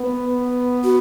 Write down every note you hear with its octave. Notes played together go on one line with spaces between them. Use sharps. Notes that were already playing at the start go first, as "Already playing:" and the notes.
Already playing: B3
F#4